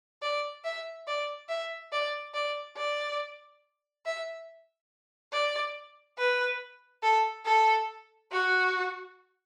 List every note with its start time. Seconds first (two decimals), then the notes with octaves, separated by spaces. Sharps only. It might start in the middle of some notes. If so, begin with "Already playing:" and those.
0.22 D5
0.64 E5
1.07 D5
1.49 E5
1.92 D5
2.34 D5
2.77 D5
4.05 E5
5.32 D5
6.18 B4
7.03 A4
7.45 A4
8.31 F#4